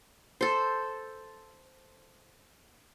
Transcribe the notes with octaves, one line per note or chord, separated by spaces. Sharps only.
A4 C5